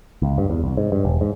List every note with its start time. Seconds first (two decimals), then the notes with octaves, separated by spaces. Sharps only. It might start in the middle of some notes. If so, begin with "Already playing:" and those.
0.22 C#2
0.38 G2
0.50 E2
0.64 C2
0.77 G#2
0.92 G2
1.05 E1
1.21 G#2